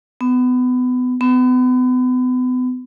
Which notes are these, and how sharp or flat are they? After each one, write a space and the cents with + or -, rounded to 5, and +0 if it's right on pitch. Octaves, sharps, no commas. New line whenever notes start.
B3 +25
B3 +35